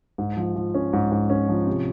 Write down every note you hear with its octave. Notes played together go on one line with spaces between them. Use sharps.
G#2
F3
F3
C#4
G#2
G#2
C#4
F3
C3